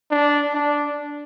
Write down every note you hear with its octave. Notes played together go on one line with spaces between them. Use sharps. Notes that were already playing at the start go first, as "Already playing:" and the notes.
D4
D4